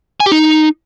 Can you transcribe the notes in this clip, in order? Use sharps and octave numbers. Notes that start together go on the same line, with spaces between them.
G#5
G4
D#4